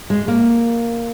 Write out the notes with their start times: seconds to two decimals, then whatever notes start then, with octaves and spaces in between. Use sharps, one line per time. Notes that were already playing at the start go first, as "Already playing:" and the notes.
0.10 G#3
0.28 A#3